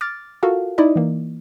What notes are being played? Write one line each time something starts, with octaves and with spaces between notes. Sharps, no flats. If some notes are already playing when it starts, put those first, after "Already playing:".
D6 F6 A6
F4 F#4 A4 A#4 F5
D#4 E4 D5 D#5
E3 A#3